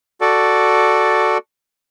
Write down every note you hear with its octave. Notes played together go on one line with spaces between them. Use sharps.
F#4 A4 D5